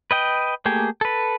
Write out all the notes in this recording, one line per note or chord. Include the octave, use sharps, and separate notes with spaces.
B4 D#5 G5
A3 A#3 G4 G#4
A4 B4